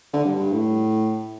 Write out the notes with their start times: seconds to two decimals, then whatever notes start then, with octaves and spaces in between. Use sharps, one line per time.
0.13 D3
0.24 G2
0.36 G2
0.52 A2